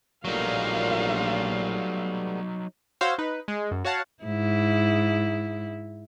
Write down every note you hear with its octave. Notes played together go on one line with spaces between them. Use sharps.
A#1 A#2 F#3 G3 A3 B3 D#4 F5
F#4 C5 C#5 F5 E6
D#4 B4
G#3
F#2
F#4 C#5 F5 F#5 A5
G#2 E4